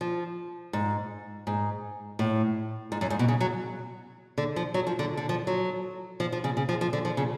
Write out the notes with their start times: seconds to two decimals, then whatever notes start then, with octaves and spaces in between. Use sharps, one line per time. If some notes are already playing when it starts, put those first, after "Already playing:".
0.01 F3
0.73 G#2
1.47 G#2
2.19 A2
2.92 G#2
3.01 F#2
3.10 G#2
3.19 B2
3.28 C#3
3.40 F#3
4.38 D3
4.56 F3
4.74 F#3
4.87 F3
4.99 D3
5.17 D3
5.29 F3
5.47 F#3
6.20 F3
6.32 F3
6.44 C#3
6.57 C#3
6.69 F3
6.81 F3
6.93 D3
7.05 F3
7.17 C#3